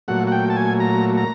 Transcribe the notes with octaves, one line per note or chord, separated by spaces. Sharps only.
A#2 F#3 A3 F#5
F#5
G5
A5
G#5
A#5
A#5